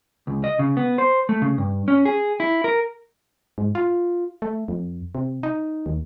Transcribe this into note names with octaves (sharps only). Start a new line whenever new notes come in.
C#2
D#5
C#3
B3
C5
A3
C#3
G2
C#4
G#4
E4
A#4
G#2
F4
A3
F2
C3
D#4
D#2